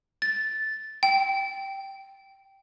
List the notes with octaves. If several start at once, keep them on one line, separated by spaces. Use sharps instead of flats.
A6
G5